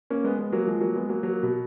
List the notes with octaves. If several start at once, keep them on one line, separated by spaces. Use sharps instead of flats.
A#3 C#4
G#3 B3
G#3 B3
F#3 A#3
F3 G#3
F#3 A#3
G#3 B3
F#3 A#3
F#3 A#3
B2